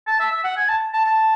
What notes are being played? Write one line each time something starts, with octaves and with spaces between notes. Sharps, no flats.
A5
E5
E5
F#5
G#5
A5
A5
A5